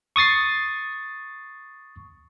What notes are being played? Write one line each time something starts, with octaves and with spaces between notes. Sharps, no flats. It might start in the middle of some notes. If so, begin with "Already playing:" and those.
C#6 D#6 A6 C7